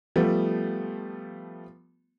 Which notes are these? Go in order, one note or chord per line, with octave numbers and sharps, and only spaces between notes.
F3 G3 A3 B3